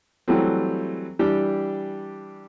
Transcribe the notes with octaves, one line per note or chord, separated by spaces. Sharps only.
E3 F#3 G3 A3 C4
E3 G3 D4 G4